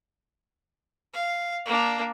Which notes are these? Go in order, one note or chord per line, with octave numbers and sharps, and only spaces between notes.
F5
A#3 D4